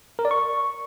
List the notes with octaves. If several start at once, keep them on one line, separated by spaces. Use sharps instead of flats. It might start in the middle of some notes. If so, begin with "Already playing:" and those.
A#4
D5
C#6